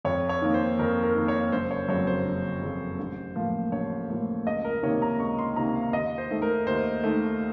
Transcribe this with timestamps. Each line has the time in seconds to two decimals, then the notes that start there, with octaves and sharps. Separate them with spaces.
0.05 F2 C#5
0.29 C#5
0.42 D#3 A#3
0.54 C5
0.79 F2 A#4
1.03 A#4
1.15 D#3 A#3
1.28 C#5
1.52 F#1 C5
1.71 C#5
1.88 F2 C#3 F#3 C#5
2.07 C5
2.26 F#1
2.62 F2 C#3 F#3
2.99 A1
3.36 A2 F3 A#3
3.72 A1 C#5
4.10 A2 F3 A#3
4.46 C#2 D#5
4.64 A#4
4.83 C3 D#3 A#3 C#5
5.02 A#5
5.20 C#2 C#6
5.39 C6
5.56 C3 D#3 A#3 A#5
5.75 F5
5.93 D#2 D#5
6.18 C5
6.30 D#3 A3
6.42 A#4
6.66 D#2 C5
7.04 D#3 A3